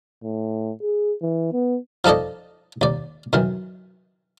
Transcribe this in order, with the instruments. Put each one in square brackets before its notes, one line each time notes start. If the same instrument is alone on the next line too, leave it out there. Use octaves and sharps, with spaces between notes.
[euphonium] A2
G#4
E3
B3
[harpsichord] F3 D#4 A4 D5 D#5
D#2 D5
F#2 D#3 E3